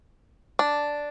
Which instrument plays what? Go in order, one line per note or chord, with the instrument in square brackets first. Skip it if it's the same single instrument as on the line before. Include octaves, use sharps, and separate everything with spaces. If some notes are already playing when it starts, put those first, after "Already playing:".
[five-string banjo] D4